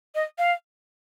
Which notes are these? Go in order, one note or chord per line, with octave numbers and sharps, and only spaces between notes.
D#5
F5